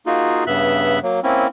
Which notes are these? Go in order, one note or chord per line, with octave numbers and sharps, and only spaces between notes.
A#3 D#4 F4 F#4 G#4
G2 C#3 B3 E5 F#6
F#3 A#3
A#3 C4 C#4 E4